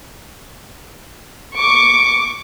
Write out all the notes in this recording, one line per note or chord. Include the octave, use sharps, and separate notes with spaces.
C#6 D6